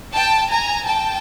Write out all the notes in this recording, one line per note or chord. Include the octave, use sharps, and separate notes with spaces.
G5 A5
G#5 A#5
G5 A5